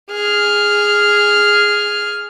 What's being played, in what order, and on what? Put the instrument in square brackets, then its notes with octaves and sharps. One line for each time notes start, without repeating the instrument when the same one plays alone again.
[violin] G#4 F6